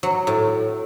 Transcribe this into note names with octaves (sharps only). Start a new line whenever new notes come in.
F#3
A2